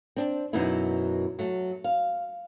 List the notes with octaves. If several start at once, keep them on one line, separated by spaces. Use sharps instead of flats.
C4 D4
F#2 B2 E3 D#4 E4
F#3 A3
F5